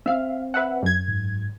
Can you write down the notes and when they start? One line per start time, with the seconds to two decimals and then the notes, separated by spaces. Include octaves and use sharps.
0.06 C4 E5 F5
0.54 B4 E5 F#5
0.82 F#2 G#6
1.08 G#2